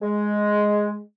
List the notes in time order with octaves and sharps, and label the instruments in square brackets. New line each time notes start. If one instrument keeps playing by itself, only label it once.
[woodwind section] G#3